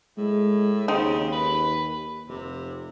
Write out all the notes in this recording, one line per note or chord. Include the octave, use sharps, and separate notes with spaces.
A2 G#3
D#2 C#3 C4 D#4
B4
F1 C3